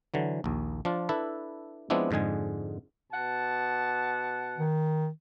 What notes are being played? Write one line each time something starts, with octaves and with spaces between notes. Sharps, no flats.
D3 E3 F#3
A#1 D#2
F3 D4 F4
D4 E4 A4 B4
F3 G#3 B3 C4 D4 E4
F2 G#2 D3 G#3 G#5
B2 F#5 A5
D#3